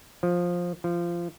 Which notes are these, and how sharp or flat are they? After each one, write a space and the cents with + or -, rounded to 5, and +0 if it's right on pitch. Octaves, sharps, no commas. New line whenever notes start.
F3 +10
F3 -20